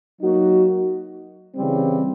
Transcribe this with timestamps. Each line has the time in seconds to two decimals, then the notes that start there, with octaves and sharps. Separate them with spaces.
0.20 F#3 A#3 D#4 F#4
1.55 C#3 E3 G3 C4